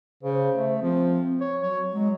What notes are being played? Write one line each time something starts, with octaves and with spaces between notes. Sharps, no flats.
C#3 C5
A3
F3 C4
C#5
F#3 C#5
F#3 G#3